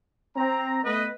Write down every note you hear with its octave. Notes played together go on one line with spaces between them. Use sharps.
C4 A#5
A3 B3 B4 D#5